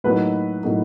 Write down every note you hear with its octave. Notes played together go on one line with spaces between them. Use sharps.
A2 F#3 A#3 D#4 B4
A2 F#3 A#3 D#4